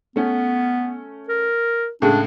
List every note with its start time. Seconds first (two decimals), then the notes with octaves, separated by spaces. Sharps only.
0.16 A3 B3 C#4
1.28 A#4
2.02 A2 C#3 G#3 D4